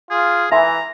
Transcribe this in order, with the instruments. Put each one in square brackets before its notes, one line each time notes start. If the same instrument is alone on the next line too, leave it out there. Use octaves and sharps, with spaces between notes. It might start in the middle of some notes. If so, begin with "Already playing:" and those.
[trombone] F4 [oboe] G#4
[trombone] E3 [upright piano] E5 G#5 C6 [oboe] A#5